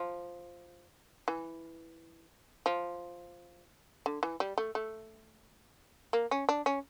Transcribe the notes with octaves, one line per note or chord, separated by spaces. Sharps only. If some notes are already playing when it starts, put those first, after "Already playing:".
Already playing: F3
E3
F3
D3
E3
G3
A3
A3
A#3
C#4
D4
C#4